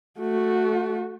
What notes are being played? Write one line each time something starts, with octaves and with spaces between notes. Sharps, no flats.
A3 F#4